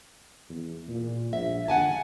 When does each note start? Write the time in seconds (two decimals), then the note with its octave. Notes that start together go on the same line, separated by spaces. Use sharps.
0.49 E2
0.88 A#2
1.33 A#1 E5
1.68 D3 F#5 G#5 A5